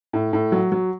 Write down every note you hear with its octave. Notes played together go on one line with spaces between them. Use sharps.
A2
A2
F#3
F#3